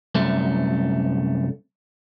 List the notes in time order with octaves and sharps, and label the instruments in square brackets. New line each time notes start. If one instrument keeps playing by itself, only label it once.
[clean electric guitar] C2 F#2 A3